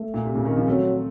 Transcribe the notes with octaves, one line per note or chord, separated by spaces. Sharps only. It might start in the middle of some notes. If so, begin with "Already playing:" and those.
Already playing: A3
A#2
C3
A#2 C#3
C3 D#3
C#3 F3
F#3 A3 C4